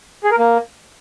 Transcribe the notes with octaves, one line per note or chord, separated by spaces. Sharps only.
G#4
A#4
A#3